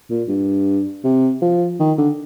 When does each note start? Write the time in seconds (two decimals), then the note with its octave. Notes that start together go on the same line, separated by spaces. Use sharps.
0.10 A#2
0.28 G2
1.04 C3
1.42 F3
1.80 D#3
1.98 D3